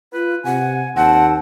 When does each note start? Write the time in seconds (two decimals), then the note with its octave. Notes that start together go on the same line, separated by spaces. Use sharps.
0.13 F4 B4
0.45 C3 F#5 G#5
0.96 D#2 C4 F#5 A5